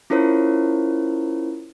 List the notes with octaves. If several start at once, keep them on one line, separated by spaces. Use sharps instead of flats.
C#4 E4 F4 A#4 C5 C#5